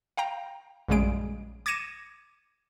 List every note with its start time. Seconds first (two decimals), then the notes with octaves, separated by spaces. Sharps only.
0.17 F5 G5 A#5
0.88 A#1 F#2 C#3 G3 G#3 D7
1.66 D6 G#6 A#6 C#7 D#7 E7